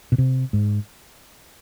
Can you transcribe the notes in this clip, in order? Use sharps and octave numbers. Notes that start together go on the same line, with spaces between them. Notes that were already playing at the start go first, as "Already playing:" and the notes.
B2
C3
G#2